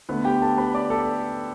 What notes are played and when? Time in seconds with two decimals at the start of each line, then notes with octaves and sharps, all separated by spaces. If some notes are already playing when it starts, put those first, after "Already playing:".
0.09 D3 A3 B3 B4
0.25 G4 G5
0.42 A4 A5
0.58 B4 B5
0.74 D5 D6
0.90 A4 A5